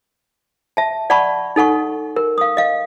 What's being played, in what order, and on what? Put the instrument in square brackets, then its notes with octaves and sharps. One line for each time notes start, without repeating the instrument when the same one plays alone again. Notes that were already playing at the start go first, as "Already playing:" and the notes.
[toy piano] E5 A5
D5 F#5 A5 B5 C#6
D#4 A4 F#5 C#6
A#4
F5 D#6
D#5 F5